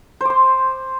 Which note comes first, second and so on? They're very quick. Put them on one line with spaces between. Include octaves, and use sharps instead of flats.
C5 D6 C6